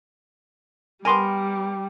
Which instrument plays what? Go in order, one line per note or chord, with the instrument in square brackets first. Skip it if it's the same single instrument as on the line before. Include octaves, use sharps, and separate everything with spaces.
[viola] G3 [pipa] B3 A#4 [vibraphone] G5 D6 [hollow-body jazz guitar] G#5 C6